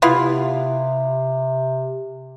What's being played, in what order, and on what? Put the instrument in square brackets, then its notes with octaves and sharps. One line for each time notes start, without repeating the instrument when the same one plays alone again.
[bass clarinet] C3 [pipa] B3 E4 F4